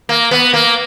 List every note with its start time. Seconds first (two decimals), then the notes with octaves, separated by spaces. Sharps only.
0.09 A#3
0.31 B3
0.54 A#3